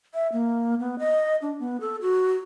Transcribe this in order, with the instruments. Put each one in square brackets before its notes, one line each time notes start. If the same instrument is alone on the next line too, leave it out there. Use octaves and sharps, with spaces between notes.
[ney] E5
A#3
B3
D#5
D4
B3
A4
F#4